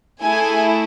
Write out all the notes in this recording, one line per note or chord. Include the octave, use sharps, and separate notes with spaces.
A3 E4 G#4 G#5